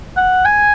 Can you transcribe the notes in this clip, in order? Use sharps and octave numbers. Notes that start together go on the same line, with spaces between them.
F#5
G#5